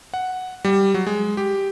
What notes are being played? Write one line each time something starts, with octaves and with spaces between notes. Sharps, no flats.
F#5
G3
F#3
G#3
G4